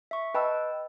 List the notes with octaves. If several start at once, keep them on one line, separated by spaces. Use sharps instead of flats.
E5 C#6
B4 D#5 G5 A5 B5 E6